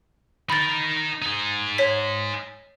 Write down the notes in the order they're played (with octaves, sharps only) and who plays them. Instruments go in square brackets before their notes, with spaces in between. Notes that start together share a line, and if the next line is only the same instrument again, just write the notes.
[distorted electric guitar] D#4 A#4 [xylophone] B5 A6
[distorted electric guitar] D#4 G#4
[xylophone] C#5 B6